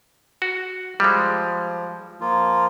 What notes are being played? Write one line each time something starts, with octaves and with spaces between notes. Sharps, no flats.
F#4
F3 G3 G#3
F3 A#3 F4